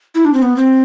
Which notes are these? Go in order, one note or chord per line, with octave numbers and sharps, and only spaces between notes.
E4
D4
C4
B3
C4